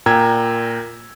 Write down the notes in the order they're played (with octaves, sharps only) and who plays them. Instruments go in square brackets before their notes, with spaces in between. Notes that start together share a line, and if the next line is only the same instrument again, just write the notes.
[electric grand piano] A#2 A#4 G5 A#5 E6 G#6